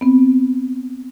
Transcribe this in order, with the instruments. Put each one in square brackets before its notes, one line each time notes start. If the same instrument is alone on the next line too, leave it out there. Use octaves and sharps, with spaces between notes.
[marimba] B3 C4